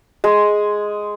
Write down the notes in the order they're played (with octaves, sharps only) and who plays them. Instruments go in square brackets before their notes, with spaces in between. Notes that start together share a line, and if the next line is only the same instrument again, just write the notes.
[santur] G#3